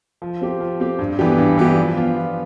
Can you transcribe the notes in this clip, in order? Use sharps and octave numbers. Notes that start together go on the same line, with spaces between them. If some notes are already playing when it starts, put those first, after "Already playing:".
F3
C4 G4
F3
C4 G4
G2
E3 B3 D4 G4
G2
E3 B3 D4 G4
F3
B3 F4
F3